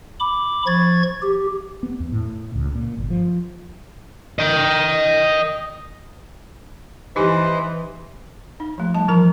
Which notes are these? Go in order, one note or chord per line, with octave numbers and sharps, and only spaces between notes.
B5 D6
F3 C#6 G#6 A6
G4
B3
E2
A2
C#2
A#2
G1
F3
D#5 G5
E3 D#4 G4 B4 C5 D#5 G#5
D#4
F3 A3
G3 A5
E3 F3 A#4 A#5